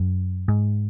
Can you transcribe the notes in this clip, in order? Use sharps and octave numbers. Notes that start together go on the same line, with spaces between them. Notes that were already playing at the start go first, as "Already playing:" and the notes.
Already playing: F#2
G#2